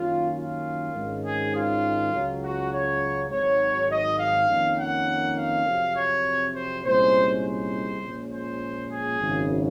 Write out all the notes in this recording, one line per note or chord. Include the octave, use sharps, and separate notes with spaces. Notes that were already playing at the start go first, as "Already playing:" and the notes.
Already playing: F#2 D#3 A#3 C#4 F4
F4
G#1 G#2 D#3 G#3 C#4
G#4
F4
C#2 C#3 F#3
F#4
C#5
G#1 G#2 F#3 C#5
D#5
F5
F2 D#3 A#3 C#4
F#5
F5
F2 C3 F#3 C4
C#5
C5
C2 A#2 G#3 C#4 C5
C5
A#1 A#2 G#3 C#4
C5
G#4
G#1 F#2 C#3